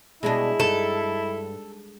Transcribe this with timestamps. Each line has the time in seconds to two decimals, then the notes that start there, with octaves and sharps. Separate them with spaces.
0.23 B2 G3 G#3 D4 E4 C#5 D#5
0.60 G2 D#4 A4